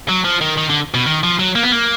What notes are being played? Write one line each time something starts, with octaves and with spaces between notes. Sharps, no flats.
F#3
F3
D#3
D#3
D3
B2
D#3
F3
F#3
A#3
B3
A#3